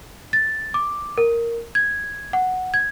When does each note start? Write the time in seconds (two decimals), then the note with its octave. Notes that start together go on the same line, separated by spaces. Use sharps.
0.33 A6
0.74 D6
1.18 A#4
1.75 G#6
2.33 F#5
2.74 G#6